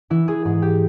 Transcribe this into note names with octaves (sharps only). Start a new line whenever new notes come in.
E3 E4
G#4
G#2 G#4
G4